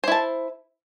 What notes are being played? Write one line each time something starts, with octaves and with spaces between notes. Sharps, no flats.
E4 C5 A5